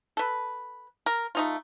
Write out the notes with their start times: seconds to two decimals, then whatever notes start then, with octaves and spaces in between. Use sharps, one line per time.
0.17 A4 B4
1.06 A#4
1.35 A3 D#4 F4